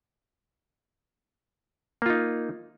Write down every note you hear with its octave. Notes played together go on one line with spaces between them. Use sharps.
A#3 D#4 F4